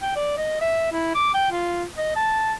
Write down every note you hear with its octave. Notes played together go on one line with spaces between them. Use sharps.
G5
D5
D#5
E5
E4
D6
G5
F4
D#5
A5